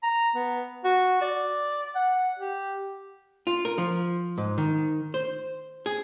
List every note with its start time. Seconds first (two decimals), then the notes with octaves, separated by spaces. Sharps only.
0.03 A#5
0.36 B3
0.84 F#4
1.22 D5
1.95 F#5
2.39 G4
3.47 F4
3.65 A#4
3.78 F3
4.38 G#2
4.58 D#3
5.14 C5
5.86 G#4